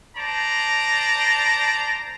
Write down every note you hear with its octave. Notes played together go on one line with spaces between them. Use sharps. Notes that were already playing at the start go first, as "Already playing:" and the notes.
C5 D5 A5 A#5